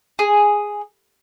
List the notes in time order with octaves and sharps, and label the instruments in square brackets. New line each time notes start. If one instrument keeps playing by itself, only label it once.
[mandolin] G#4